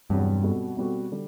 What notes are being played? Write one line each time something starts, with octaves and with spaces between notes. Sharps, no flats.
E2 G2 C3 F#3
B2 G3 C4 F#4 A4
B2 G3 C4 F#4 A4
D3 G3